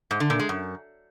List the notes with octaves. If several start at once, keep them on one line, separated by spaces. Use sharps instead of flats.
G#2
D3
A#2
G#3
F#2